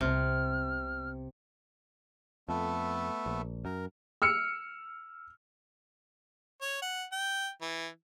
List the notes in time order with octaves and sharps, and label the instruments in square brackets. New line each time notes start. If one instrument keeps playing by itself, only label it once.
[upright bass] C2 B3 [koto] C3 [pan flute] F6
[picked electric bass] F2 [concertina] A3 B3 A4
[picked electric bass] A#1
[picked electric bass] F#2 [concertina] A#4
[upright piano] E6 F6 C#7
[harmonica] C#5
F#5
G5
E3